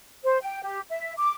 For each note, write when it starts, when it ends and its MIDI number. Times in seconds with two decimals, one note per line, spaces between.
0.24 0.38 72
0.42 0.60 79
0.63 0.80 67
0.90 1.13 76
1.18 1.35 86